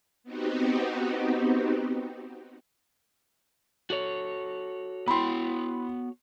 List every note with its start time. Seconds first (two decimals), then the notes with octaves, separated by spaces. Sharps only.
0.24 B3 C4 D#4 F#4 G4
3.90 F#4 A4 C#5
5.08 B3 E4 G5 B5 C6